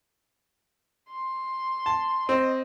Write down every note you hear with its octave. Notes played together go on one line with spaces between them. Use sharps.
C6
A5
C4 D#5